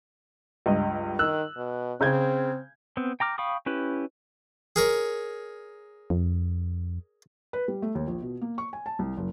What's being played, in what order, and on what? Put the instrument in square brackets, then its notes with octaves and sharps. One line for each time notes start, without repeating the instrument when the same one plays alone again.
[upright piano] C#2 G2 D#5
[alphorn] D#3 [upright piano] E6 F#6
[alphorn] B2
[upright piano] C#3 G6 G#6 [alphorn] C4
[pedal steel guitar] B3 C4
G5 A#5 D6 F6
F5 G5 B5 C#6 D#6
C#4 E4 G4 B4
[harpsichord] G#4 A#4 C#5
[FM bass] F2
[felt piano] B4
G3
A3
D#2
A#1
B2
A#3
C#6
G#5
A5
C2
F#1